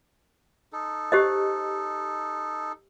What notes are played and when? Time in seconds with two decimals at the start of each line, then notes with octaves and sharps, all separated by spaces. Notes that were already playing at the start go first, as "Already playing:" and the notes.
0.73 D#4 A4
1.12 G4 C5 D#5